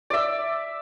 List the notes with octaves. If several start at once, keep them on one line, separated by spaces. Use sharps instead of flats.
D5 E5